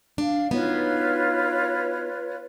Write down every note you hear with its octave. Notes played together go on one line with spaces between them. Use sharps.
D4 F5
B3 D#4 F4 F#4 B4 C#5